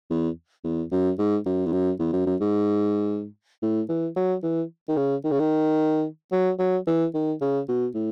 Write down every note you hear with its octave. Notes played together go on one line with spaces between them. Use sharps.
E2
E2
F#2
G#2
F#2
E2
F#2
E2
F#2
F#2
G#2
A2
E3
F#3
E3
D#3
C#3
D#3
C#3
D#3
F#3
F#3
E3
D#3
C#3
B2
A2